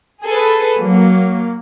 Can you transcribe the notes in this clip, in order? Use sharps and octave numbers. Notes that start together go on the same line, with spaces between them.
G#4 A4 B4
F#3 A#3